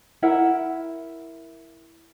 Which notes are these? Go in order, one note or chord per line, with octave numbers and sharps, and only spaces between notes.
E4 A#4 E5 F#5